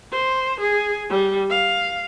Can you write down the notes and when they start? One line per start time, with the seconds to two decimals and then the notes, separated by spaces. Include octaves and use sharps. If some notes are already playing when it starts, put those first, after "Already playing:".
0.12 C5
0.61 G#4
1.10 G3
1.50 F5